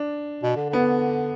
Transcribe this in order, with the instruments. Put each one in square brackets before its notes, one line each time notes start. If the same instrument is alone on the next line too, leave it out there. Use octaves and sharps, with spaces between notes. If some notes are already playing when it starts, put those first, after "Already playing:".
Already playing: [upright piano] D4
[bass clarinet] B2
D3
[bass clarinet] D3 [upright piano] B3